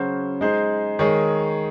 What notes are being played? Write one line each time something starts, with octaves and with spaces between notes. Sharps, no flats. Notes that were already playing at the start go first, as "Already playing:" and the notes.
Already playing: C#3 F#3 C#4 F#4 C5
G#3 D#4 G#4 C5
D#3 G#3 D#4 G#4 C#5